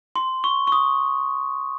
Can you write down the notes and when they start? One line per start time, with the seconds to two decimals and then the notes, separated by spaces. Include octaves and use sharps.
0.16 C6
0.44 C#6
0.67 C#6
0.72 D#6